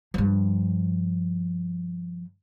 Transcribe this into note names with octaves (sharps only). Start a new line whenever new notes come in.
G2 F3